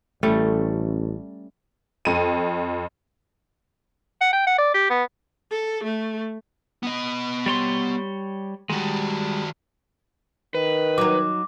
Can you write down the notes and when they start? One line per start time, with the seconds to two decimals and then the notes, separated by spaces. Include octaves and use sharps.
0.23 A1 G3 A3 C#4
2.05 F2 D#7
4.21 F#5
4.33 G5
4.47 F#5
4.58 D5
4.74 G4
4.90 B3
5.51 A4
5.84 A3
6.83 B3 D#5
7.46 G3 C#5 C6
8.70 D#3 G3 G#3 F#4
10.55 D#3 B4
10.98 F#3 D#4 D6